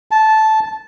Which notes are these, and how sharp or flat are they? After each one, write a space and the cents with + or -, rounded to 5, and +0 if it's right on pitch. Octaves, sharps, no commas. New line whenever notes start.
A5 -10